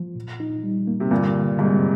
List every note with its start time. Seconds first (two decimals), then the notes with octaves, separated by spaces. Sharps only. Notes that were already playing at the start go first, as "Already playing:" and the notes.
Already playing: F3
0.15 A#2
0.40 D#4
0.64 G3
0.87 A#3
1.00 C3
1.11 G2 A#2 D3
1.35 D3
1.59 G#2 C3 G3